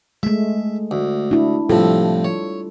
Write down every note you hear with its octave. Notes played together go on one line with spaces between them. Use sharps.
G#3 A3 E5
D2
D4 E4
A2 C3 F3 G3 F4 A4
C#5